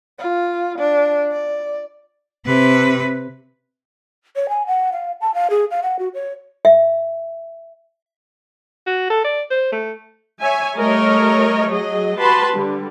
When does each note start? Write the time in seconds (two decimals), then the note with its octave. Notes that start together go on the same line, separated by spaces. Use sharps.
0.19 F4
0.79 D4
1.32 D5
2.46 C3 B4
4.36 C#5
4.49 G#5
4.66 F#5
4.92 F5
5.21 A5
5.34 F5
5.50 G#4
5.71 F5
5.83 F#5
5.99 F#4
6.14 C#5
6.65 E5
8.87 F#4
9.10 A4
9.25 D5
9.51 C5
9.72 A3
10.40 C#5 E5 G#5
10.76 G3 A3 A#4 C#5 D#5
11.68 F#3 G#4 D#5
12.19 F#4 G4 B4 A5 B5 C6
12.53 D3 G3